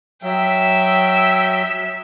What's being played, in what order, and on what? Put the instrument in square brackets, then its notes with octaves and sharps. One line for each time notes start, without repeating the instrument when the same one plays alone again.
[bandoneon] F#3 [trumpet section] G#3 E5 [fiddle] G5